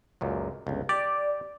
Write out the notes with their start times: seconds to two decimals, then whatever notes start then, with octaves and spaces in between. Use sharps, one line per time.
0.21 C#2 F#2 A#2
0.67 G1 C#2
0.89 G4 D5